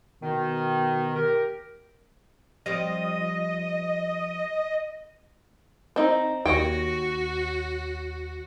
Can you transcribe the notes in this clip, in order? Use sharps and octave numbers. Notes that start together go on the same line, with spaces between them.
B2 D#3
G4 A#4
F3 G3 C4 D#5
C4 D#4
D#2 F#4 C#5 G5 A#6